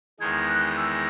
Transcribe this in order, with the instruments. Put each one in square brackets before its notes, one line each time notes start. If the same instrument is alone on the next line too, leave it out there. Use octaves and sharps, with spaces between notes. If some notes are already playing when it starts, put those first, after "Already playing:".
[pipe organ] E2 D#3 G#3 D#4 [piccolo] G#6
[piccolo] F#6
E6